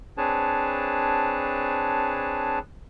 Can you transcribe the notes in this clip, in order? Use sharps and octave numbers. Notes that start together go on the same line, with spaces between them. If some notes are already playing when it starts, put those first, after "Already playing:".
C4 D4 G#4 B4 C#5 A5